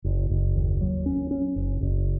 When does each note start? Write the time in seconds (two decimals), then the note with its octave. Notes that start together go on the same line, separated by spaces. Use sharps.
0.04 F#1
0.30 F#1
0.55 D#2
0.81 F#3
1.06 C#4
1.31 C#4
1.56 F#1
1.81 F#1